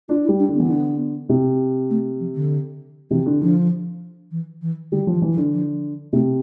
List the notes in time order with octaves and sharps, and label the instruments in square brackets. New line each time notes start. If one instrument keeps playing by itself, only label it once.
[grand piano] D4 [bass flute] F4
[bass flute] E4
[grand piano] G3
[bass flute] D4
[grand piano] D3
[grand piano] E3 [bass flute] B3
[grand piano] D3
C3
[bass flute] A3
F3
D3
[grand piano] C3 [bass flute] E3
[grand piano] D3
[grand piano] D3 [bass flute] F3
[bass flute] E3
E3
[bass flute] D3 [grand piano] G3
[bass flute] E3 [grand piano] F3
[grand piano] E3
[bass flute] F3
[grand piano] D3
[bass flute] F3
[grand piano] C3 [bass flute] A3